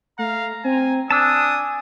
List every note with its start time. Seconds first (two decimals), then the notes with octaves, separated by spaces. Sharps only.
0.19 A3 F5 A#5
0.64 C4 G#5
1.11 D4 G#5 A5 D#6 E6